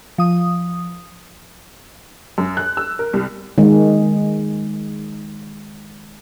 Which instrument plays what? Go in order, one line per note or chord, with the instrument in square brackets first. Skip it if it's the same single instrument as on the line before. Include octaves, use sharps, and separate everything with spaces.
[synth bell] F3 D#6
[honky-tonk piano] F#2
F#6
E6
A#4
C2
[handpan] D#3 G#3